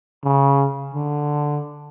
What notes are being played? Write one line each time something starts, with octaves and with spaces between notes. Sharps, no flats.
C#3
D3